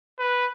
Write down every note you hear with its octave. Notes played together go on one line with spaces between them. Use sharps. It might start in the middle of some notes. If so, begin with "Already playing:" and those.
B4